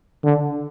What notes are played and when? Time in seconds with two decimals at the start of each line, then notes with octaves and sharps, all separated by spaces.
0.24 D3